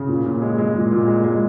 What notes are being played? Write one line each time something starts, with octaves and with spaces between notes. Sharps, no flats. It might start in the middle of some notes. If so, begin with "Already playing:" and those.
Already playing: C#3
A#2
A#2
G#3
G#3
A#2
A#2
G#3
G#3